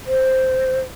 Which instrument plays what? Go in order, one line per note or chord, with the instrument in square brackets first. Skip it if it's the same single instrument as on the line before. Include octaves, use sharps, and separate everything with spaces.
[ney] C5